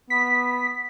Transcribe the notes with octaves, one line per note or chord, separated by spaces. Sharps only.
B3 B6